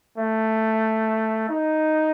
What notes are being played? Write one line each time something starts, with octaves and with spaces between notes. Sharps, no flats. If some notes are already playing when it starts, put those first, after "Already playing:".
A3
D#4